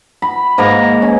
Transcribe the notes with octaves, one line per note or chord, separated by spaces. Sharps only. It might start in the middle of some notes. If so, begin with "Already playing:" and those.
B5
G#2 A#3 A#5
C#4